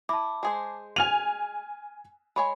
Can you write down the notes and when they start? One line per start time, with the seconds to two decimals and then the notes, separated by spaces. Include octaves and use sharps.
0.09 E4 A5 D6
0.43 G#3 G#4 C5
0.96 G#5 F6 D#7 F7
2.36 G#3 C#5 G#5 B5